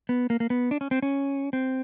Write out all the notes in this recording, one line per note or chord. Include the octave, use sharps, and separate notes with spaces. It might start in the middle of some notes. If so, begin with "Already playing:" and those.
B3
A#3
A#3
B3
D4
C#4
C4
C#4
C4